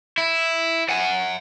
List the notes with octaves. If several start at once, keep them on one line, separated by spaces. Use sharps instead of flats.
E4
F#5 G#5